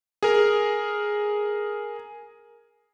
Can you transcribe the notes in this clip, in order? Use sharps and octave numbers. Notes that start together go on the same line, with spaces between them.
G#4 A#4